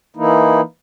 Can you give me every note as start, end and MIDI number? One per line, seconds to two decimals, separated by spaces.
0.16 0.61 52
0.16 0.61 58
0.16 0.61 63
0.16 0.61 64